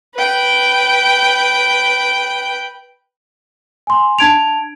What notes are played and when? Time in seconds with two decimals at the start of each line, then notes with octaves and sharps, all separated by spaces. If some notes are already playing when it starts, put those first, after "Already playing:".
0.15 B4 G5
3.87 G#5 C6
4.19 D4 A5 G#6 D7 F7